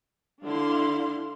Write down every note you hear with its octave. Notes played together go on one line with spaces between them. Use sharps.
D3 D4 E4 F5 C6